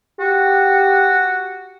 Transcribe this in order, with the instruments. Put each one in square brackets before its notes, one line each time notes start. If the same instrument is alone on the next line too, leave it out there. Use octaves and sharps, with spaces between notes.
[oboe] F#4 [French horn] G4